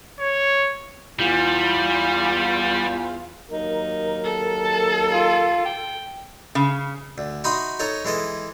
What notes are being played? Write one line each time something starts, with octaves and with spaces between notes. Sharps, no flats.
C#5
E2 G3 F4
D#2 F#3 D#4 A#4
A4
A5
F4
G5
C#3
D2
D#4 F#4 E5 B5 C6 D#6
D#4 A4 A#4 C#5
E3 G#3 A4 D#5